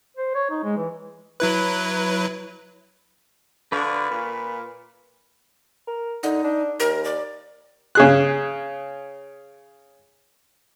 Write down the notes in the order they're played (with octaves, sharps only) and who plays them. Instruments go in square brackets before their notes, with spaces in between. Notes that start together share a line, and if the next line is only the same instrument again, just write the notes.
[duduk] C5
C#5
D#4
G#3
E3
[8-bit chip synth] F#3 E4 B4
[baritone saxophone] D3 [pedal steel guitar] B4 F5 C#6
[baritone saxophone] A#2
[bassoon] A#4
[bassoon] D3 [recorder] D#4
[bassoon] D4
[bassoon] D#2 [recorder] A#4
[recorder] D5
[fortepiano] C#3 G#4 F#6